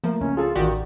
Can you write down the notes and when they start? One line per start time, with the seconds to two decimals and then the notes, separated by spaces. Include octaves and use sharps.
0.04 F3 A3 A#3 A#4
0.21 C#2 C#4
0.37 F4 G#4 A4 A5
0.56 A1 D#3 F#4 G4 D5